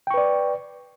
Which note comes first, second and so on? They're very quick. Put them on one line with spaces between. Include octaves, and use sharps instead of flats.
G5 C#6 B4 D5